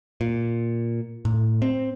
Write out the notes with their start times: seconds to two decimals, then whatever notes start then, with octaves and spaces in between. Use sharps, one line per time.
0.21 A#2
1.25 A2
1.62 C4